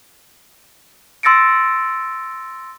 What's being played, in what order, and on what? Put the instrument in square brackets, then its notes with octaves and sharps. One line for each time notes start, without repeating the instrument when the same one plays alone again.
[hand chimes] C6 E6 A6 A#6 C#7 D7